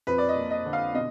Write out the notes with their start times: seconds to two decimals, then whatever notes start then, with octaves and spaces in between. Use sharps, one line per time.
0.07 F2 B4
0.18 D5
0.29 D#5
0.35 A#3
0.50 D#5
0.65 D3
0.73 F5
0.94 B2 D#5